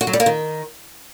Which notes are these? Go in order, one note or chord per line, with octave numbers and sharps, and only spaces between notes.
F#4
F#3
G3
A#3
D#3